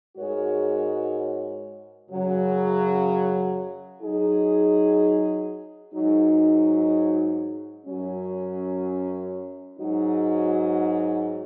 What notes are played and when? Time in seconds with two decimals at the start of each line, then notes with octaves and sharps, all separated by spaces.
0.16 G#2 G#3 F#4 A#4 C#5
2.09 F#2 C#3 F#3
4.00 F#3 D#4 G#4
5.93 G#2 F#3 D#4
7.86 F#2 F#3 C#4
9.78 G#2 F#3 D#4 F#4